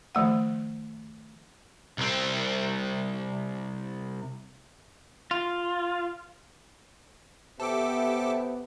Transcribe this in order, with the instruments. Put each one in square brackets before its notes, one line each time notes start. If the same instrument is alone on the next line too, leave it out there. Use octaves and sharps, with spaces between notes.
[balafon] D#3 F3 A3 F#5
[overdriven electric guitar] C2 C4
[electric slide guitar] F4
[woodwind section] C3 [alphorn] B3 [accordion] G4 E5 [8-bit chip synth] A4 D6